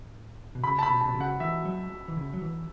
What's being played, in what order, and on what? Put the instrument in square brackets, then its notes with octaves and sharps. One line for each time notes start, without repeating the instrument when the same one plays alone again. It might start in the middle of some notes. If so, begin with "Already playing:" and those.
Already playing: [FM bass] A2
B2
[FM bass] C#3 [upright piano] B5
[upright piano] A5
B5
[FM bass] B2
[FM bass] B2 [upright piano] A5
[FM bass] C#3
[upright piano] F#5
[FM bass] E3 [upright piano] E5
[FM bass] F#3
E3
C#3
F#3
E3